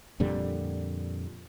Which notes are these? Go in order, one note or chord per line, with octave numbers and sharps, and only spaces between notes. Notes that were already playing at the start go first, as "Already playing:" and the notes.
F2 A#2 D3 G3